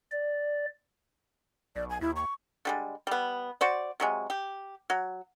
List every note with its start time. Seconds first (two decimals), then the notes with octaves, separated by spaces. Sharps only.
0.11 D5
1.76 B1 D5
1.90 G#5
2.01 D#2 E4
2.16 C#6
2.65 D3 G3 G#3
3.07 G3 B3
3.61 F#4 C5 D5
4.00 C3 F#3 G#3
4.30 G4
4.90 F#3